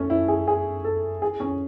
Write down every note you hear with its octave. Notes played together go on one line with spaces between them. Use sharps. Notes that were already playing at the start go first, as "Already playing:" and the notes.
Already playing: A3 C#4
E4
G#4
G#4
A4
G#4
C#4